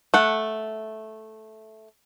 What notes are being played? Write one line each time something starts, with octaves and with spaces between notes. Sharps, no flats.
A3 F#5